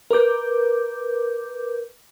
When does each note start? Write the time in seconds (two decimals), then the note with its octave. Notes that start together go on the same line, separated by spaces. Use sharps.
0.11 A#4 B4 D6 G6